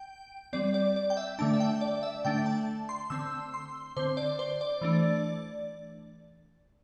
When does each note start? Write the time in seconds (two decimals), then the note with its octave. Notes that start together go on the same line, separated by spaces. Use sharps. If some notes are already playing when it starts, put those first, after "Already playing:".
Already playing: G5
0.53 G3 C4 D5
0.74 D5
0.96 D5
1.10 G5
1.17 E5
1.39 D3 A3 D4 A5
1.54 E5
1.60 G5
1.81 D5
2.03 E5
2.25 D3 A3 D4 G5
2.46 A5
2.89 C6
3.10 D3 C4 E6
3.54 C6
3.97 D3 C4 C5
4.17 D5
4.39 C5
4.61 D5
4.81 E3 A3 D4